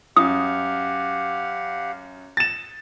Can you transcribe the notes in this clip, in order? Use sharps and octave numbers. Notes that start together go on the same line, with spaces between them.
F#2 G4 F5 F#5 D#6
A6 E7